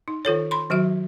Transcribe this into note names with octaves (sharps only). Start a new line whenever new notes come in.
D#4
D#3 F4 A4 C#5
B5 C6
D#3 F#3 F#4 E5